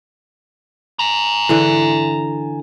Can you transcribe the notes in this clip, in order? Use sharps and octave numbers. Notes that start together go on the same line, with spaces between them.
G#5 A#5
D3 E3